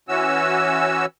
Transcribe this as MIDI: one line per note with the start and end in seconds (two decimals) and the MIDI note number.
0.09 1.06 52
0.09 1.06 61
0.09 1.06 66
0.09 1.06 88